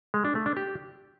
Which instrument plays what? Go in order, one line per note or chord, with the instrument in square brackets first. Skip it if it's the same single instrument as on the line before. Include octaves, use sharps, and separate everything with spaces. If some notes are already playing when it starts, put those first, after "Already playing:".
[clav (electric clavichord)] G#3
D4
A3
D4
G4